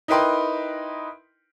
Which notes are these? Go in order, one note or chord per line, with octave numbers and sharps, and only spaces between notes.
D#4 E4 A#4 B4 G5 C6